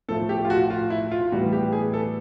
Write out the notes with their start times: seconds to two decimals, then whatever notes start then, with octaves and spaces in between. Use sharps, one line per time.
0.08 A2 F3 A3 A4
0.29 G4
0.45 F4
0.50 F#4
0.70 F4
0.90 E4
1.11 F4
1.32 A2 E3 G3 B3 F#4
1.53 G4
1.72 G#4
1.94 A4